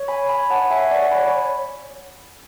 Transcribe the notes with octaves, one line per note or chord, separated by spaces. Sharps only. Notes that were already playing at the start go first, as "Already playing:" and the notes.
Already playing: C#5
G#5 B5
G#5 B5
F#5 A5
C#5 E5 G#5
D5 F#5
G#5 B5